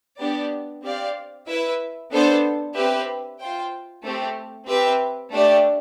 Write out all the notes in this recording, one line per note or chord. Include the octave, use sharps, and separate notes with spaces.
B3 D4 G4 D5
C4 G4 D5 F5
E4 B4 E5
B3 D4 A4 C5
C4 G4 B4 E5
F4 C5 G5
A3 C4 G4
C4 G4 B4 E5
A3 D4 G4 D5